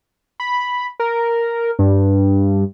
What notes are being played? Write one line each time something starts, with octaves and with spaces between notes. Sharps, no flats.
B5
A#4
G2